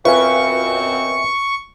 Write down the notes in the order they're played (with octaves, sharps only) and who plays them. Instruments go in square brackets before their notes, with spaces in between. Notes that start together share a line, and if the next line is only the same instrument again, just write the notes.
[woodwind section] F#2 B2 C4 [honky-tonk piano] F4 B4 [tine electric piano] E5 G#5 [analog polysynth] C#6